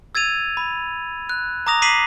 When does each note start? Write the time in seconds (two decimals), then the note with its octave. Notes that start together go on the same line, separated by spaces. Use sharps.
0.15 E6 G#6 A6 D#7 F7
0.57 B5
1.29 F#6
1.67 A#5 D6 D#6 A#6 F7
1.82 D6 B6 C7 D#7 F#7